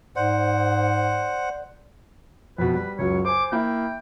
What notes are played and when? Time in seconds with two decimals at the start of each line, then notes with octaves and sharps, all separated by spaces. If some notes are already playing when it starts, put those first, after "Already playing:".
0.16 G#2 C5 D5 F#5
2.58 F2 B2 B4
2.75 G3 B4
2.99 C#2 F#2 F#3 C#5
3.25 C5 G#5 D6
3.52 A#3 E4 G5